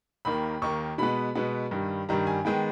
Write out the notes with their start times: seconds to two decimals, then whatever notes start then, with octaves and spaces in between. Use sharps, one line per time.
0.25 D#2 D#3 A#3 B5
0.62 D#2 D#3 A#3 C#6
0.98 B2 G#3 B3 B5
1.35 B2 G#3 B3
1.71 G2 D#3 G3
2.09 G2 D#3 G3 A#5
2.27 G#5
2.45 D#3 G#3 B3 G5